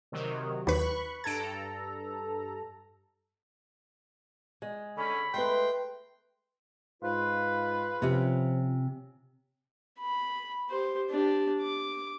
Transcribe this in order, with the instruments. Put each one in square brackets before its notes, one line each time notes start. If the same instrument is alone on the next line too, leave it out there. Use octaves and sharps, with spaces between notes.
[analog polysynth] C3 D#3 F#3
[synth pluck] D#2 B4 [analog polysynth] B5 C#6 F#6
[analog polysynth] G2 A4 A#5 [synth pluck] G#6 D7
[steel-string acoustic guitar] G#3
[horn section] D3 C#4 [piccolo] B5
[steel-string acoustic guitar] G#3 A3 B4 [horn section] G5 C6
[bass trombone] G#2 [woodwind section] F4 B4
[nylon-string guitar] C3 C#4 [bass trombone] F3
[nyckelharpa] B5
G4 C5
D4 G4
D6